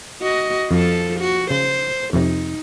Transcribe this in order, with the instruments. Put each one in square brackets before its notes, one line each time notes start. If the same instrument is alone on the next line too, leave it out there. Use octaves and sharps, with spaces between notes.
[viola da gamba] F#4 D#5
[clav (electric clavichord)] F2 [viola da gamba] F3 A4
[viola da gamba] F#4
[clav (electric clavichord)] C#3 [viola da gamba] C5
[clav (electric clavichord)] F2 C3 [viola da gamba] D#4